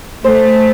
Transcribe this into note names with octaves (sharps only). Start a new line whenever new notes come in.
A3 C5